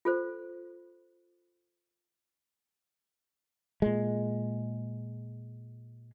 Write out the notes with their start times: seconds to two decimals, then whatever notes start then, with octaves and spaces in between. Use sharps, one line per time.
0.05 F4 A4 C5
3.82 A#2 G#3